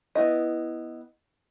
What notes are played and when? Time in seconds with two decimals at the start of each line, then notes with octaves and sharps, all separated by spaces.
0.15 B3 E4 D#5